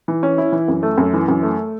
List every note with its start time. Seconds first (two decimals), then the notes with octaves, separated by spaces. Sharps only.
0.08 E3
0.23 C#4
0.38 E4
0.52 E3
0.68 F#2
0.83 A3
0.98 F#2
1.13 E3
1.28 F#2
1.43 A3